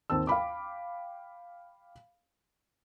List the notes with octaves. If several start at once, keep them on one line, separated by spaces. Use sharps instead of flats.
D#2 C4 A5 E6
F5 G5 B5 D6